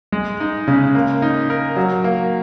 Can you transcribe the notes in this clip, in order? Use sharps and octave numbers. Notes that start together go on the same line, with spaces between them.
G#3
D#4
C#3
A#3
D#4
A#4
F#3
A#3